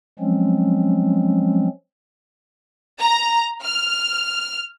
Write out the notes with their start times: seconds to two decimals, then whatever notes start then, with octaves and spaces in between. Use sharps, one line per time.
0.19 F3 F#3 G#3 C4 C#4
2.99 A#5
3.64 F6